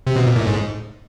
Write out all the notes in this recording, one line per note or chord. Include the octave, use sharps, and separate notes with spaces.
C3
B2
A#2
A2
G#2